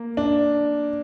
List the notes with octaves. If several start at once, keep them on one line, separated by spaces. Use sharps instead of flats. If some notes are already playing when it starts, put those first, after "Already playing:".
Already playing: A#3
D4